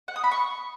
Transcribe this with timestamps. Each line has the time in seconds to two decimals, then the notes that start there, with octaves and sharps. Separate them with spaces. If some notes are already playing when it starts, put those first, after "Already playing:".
0.08 F#5
0.16 D#6
0.24 B5
0.31 C#6